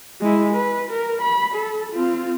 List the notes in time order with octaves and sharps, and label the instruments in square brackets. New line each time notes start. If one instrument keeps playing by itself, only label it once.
[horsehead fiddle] G#3 E4
B4
A#4
B5
A4
C4 F4